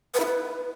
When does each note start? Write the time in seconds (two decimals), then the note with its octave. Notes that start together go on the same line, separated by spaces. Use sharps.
0.14 B4
0.20 E4
0.25 B4